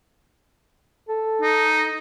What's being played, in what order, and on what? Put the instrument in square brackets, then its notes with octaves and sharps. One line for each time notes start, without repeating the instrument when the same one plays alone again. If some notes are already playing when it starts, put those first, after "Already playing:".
[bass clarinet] A4
[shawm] D#4